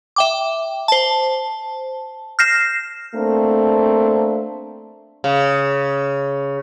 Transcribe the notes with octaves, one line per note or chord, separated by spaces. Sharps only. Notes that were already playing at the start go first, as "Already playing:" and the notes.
E5 G5 D6
C5 A5
F6 G6 A#6 C7 E7
A3 A#3 C4 D4
C#3